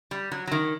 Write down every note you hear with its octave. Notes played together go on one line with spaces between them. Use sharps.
G3
F#3
F#3
D#3